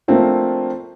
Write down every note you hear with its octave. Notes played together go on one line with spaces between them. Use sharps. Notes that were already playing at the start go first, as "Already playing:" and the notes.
F3 A3 A#3 C4 D4 F4